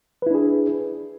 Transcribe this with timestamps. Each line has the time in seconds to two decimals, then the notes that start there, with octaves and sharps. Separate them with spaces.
0.22 B4
0.26 E4
0.31 D4
0.35 G#4